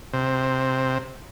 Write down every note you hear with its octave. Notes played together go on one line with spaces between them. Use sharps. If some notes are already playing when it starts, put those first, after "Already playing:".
C3